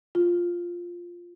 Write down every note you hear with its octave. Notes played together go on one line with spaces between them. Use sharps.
F4